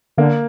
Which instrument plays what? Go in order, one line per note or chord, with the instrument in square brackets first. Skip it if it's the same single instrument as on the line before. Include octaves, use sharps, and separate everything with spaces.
[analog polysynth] D3 [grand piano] A#3